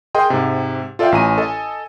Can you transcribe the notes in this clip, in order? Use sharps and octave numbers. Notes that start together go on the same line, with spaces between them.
G#4 A#4 D#5 G5 C6
G#2 C3
F4 A4 D5 E5 F5 G5
A1 G#5 A#5 D#7
A4 D#5 G#5